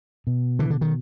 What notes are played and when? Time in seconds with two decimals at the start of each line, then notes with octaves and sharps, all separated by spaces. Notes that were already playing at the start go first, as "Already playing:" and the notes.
0.27 B2
0.59 D3 E3
0.70 D3
0.81 D#3